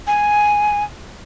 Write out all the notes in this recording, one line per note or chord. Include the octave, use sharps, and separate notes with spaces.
G#5